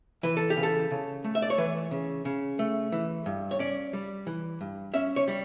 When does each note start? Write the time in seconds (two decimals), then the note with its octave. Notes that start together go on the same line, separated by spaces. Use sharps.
0.23 E3 B4
0.37 A4
0.50 G4
0.57 C#3
0.63 A4
0.91 C#3
1.24 A3
1.35 E5
1.42 D5
1.50 C#5
1.58 E3 B4
1.91 C#3
2.25 C#3
2.59 A3
2.92 E3
3.26 G2
3.51 C#5
3.59 C#4 D5
3.93 G3
4.27 E3
4.61 G2
4.94 C#4 E5
5.16 C#5
5.28 G3